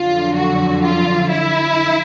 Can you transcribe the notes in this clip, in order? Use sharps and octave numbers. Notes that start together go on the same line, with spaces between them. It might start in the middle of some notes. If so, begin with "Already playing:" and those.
Already playing: F2 D3 F#3 F4
F#4
F4
E4